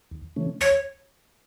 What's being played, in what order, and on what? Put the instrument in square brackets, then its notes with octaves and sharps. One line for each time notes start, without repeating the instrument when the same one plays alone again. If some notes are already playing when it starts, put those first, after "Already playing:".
[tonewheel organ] D#2
C#3 E3 A3 C#4
[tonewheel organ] D#2 [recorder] C#5